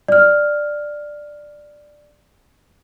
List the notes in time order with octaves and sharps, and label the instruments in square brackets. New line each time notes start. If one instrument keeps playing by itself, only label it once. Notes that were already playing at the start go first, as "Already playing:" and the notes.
[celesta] D5 F6